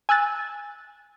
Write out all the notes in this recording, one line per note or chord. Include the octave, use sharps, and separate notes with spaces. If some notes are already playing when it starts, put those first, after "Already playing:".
G#5 E6 F#6 A6